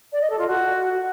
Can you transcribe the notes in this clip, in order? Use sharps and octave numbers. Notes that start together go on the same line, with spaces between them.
D5
D#5
A4
F4
F#4